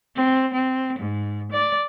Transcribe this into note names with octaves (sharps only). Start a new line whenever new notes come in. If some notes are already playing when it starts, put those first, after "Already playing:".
C4
C4
G#2
D5